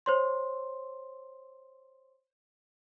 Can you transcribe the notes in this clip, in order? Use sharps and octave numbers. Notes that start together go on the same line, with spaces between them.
C5 C#5 C6